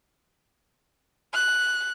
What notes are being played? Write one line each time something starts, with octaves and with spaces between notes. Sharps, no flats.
F#6